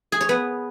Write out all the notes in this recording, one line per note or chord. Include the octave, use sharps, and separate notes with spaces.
G#4
C#5
B3